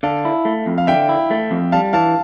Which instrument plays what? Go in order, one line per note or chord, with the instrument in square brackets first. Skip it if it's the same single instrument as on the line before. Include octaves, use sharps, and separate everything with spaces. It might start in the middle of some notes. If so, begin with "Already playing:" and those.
[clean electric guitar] D3 [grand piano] F5 A5
[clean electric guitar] E4
A3
F2
[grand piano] F5
[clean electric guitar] D3 [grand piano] E5 G5
[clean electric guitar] E4
A3
F2
[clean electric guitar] G3 [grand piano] F5 A5
[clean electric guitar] E3 [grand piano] F5 A5